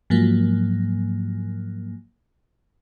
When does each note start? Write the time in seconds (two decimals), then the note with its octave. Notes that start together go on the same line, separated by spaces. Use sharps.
0.10 G#2 F3 F#3 A#3